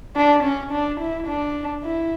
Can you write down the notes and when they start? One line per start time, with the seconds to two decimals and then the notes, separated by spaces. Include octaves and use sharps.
0.16 D4
0.43 C#4
0.72 D4
1.00 E4
1.27 D4
1.85 E4